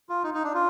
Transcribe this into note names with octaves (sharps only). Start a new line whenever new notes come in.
F4
D#4
D#4
D4
F4